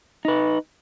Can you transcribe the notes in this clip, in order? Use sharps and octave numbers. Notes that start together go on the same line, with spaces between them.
D#4 B4